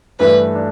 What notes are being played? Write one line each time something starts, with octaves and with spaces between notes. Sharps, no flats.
G2 E3 A3 D4 B4
D4